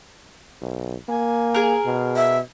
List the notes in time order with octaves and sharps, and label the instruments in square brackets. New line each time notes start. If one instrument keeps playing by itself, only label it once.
[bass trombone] B1
[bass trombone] A#3 [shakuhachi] G#5
[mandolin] G#4 A#4
[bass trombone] B2
[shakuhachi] E5